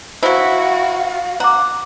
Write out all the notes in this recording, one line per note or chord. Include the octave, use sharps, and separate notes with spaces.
F#3 E4 F#4 C5 F5
F#5 A#5 D6